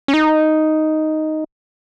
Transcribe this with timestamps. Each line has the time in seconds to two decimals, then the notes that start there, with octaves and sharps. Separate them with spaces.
0.08 C#4
0.14 D#4